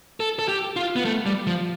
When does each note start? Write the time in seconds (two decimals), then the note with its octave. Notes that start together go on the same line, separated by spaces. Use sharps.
0.20 A4
0.39 A4
0.48 G4
0.76 F4
0.96 B3
1.05 A3
1.26 G3
1.47 F3